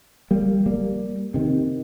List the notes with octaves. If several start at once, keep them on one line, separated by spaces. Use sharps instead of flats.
G3 A#3
G3 A#3
C3 D#3